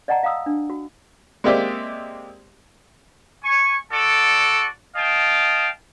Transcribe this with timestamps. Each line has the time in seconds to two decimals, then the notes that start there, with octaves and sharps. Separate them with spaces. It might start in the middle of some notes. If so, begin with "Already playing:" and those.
0.08 D5 D#5 F#5 A5 A#5
0.23 F5 A#5 D#6 E6
0.46 D4
0.70 F#4
1.44 G#3 A#3 C4 G4 D5 E5
3.43 G#5 C#6
3.92 F#4 A4 D5 A5
4.96 D#5 F5 G5 A5